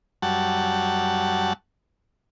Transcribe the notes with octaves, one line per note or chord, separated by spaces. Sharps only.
F#2 G3 F#5 A5